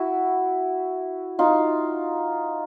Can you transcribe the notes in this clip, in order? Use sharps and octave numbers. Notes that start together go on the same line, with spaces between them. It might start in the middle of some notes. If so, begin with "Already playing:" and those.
Already playing: E4 F#4
D#4 F4